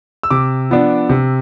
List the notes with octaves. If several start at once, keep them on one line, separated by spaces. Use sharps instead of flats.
E6
C3 D6
F3 B3 D4
C3